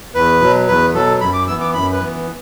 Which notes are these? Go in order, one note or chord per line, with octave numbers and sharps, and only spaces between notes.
E2 B4
B2 F#3
E2 B4
B2 F#3 A4
F#2 B5
D6
E3 B3 E6
D6
F#2 B5
B4
E3 B3